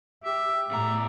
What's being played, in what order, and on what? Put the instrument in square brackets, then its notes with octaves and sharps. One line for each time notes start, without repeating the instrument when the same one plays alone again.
[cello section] G4 [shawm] E5
[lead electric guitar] E2 A#5 [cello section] A2 [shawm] E5